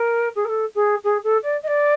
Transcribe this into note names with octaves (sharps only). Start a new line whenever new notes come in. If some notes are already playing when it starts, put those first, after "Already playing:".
Already playing: A#4
G#4
A#4
A4
G#4
G#4
A4
D5
D#5
D5